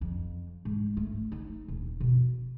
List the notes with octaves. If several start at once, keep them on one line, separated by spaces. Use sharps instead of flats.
F2
G#2
A3
D#4
D#1
B2